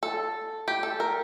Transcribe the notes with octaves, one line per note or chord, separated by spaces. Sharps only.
A4
G4
A4
A#4